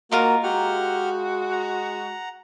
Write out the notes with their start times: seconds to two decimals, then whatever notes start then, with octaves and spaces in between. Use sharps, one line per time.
0.11 A#3 D#4 F4 F#4 A#4
0.43 G#3 F#4 G4 F#5 F6
1.51 F#5 A#5